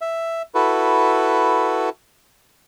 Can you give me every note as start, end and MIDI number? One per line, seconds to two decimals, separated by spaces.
0.01 0.42 76
0.55 1.89 64
0.55 1.89 66
0.55 1.89 69
0.55 1.89 71